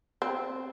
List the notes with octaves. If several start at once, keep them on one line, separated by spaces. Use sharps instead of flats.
C4